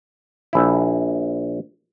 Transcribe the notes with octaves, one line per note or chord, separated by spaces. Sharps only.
A#1 E4